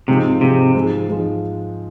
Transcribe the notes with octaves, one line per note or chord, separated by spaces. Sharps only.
G#2 C3 F3 G#3 C4 D#4
G#2 C3 F3 G#3 C4 D#4
G#2 F3 G#3
G#2 F3 G#3